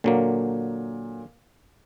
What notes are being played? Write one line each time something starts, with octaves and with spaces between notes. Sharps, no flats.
A#2 D3 F#3 A#3